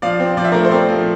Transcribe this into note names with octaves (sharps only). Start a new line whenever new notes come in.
F3 D5 F5
C4
F3 D5
E5
A3 A#4 D5
C5
C4 A#4 D5
F3